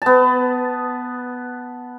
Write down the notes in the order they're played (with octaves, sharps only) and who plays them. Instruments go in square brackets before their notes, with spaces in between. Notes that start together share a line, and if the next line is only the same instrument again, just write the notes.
[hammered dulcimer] B3 A5